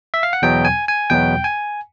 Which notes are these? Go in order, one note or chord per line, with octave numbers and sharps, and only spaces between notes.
E5
F5
F#5
E2 B2 F#3 B3 G5
G#5
G#5
E2 B2 F#3 B3 G5
G#5